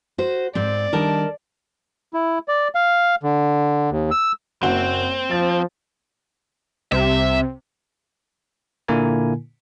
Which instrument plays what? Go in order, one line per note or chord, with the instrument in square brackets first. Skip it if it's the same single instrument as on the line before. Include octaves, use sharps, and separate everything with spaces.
[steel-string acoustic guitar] F#4 C5
[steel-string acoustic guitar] G#2 C4 [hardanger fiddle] D5
[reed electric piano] D#3 G3 D4 [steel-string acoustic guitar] A#4 D#5 A5
[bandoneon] E4
D5
F5
D3
D#2
E6
[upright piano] F#1 F#2 F#4 [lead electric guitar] C4
[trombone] F3 [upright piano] A6
[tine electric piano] C2 [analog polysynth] C3 [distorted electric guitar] E5
[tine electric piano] A#2 D3 A#3 E4 A#4 G#5